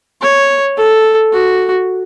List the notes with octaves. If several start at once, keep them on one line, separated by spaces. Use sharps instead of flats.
C#5
A4
F#4